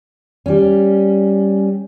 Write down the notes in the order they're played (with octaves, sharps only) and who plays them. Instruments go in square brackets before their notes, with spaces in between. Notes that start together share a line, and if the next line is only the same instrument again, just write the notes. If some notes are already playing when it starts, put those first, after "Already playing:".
[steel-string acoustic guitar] G3 C#4